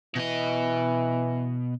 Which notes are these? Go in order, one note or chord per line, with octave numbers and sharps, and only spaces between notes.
B2 E3 D#5